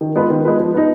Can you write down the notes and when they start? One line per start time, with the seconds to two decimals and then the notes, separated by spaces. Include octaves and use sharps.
0.01 D#3
0.16 G#3 B3 F4 B4
0.30 D#3
0.45 G#3 B3 F4 B4
0.60 F3
0.74 B3 D#4